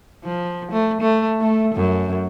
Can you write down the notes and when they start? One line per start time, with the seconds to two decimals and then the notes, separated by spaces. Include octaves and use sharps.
0.24 F3
0.71 A3
1.01 A3
1.41 A3
1.74 F#2